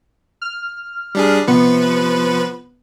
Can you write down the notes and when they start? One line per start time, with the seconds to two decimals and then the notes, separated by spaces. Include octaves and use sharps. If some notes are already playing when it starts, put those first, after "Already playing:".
0.42 F6
1.15 G3 D4 G#4
1.47 C3 F3 B3 B4 C#7